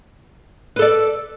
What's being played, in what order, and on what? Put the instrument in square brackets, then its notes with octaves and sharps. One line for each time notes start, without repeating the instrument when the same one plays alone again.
[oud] B4
A4
D5